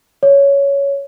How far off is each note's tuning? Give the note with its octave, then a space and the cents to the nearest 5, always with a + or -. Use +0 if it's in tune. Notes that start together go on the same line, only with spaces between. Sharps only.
C#5 +10